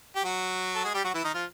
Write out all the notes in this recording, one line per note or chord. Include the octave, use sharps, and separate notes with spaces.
G4
F#3 F#4
A4
G#3 G#4
G3 G4
F#3 F#4
E3 E4
D#3 D#4
F3 F4